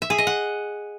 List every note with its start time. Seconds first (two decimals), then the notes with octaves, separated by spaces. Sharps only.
0.02 E5
0.10 G#4
0.18 D#5
0.27 F#5